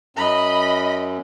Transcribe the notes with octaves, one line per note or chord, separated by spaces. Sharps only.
F#2 D#5 B5